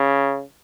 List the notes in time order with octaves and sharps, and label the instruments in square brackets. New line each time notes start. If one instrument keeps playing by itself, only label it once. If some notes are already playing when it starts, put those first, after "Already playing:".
Already playing: [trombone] C#3